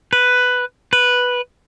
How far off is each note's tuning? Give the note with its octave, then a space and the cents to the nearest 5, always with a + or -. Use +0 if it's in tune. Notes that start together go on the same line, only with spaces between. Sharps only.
B4 +5
B4 -5